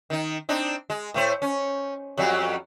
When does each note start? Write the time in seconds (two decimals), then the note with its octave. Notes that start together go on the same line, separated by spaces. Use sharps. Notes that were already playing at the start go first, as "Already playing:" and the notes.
0.10 D#3 D#4
0.49 C4 D4 D#4
0.90 G#3
1.14 A2 A3 C5
1.42 C#4
2.17 F2 F#3 G3